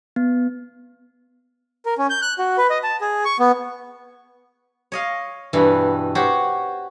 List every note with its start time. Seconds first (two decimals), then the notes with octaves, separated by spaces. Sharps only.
0.16 B3
1.86 A#4
1.98 C#4
2.10 G6
2.22 F#6
2.39 F#4
2.58 B4
2.70 D#5
2.83 A5
3.01 G#4
3.25 C#6
3.40 B3
4.92 C#5 D#5 F5
5.53 G2 B2 E3 G3
6.15 F#4 G4 C5 C#5